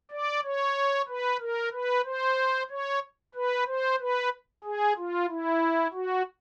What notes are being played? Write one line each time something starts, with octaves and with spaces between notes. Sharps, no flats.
D5
C#5
B4
A#4
B4
C5
C#5
B4
C5
B4
G#4
F4
E4
F#4